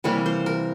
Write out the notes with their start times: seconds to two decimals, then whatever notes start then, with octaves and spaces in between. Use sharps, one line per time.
0.04 C3 E3 G3 A#3 C#5
0.26 C5
0.46 A#4